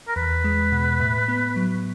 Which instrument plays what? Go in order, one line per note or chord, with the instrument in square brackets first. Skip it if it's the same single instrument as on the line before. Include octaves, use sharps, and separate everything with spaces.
[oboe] A#4
[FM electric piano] E2 [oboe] B4
[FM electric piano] G#3
B2
A2
B3
F#3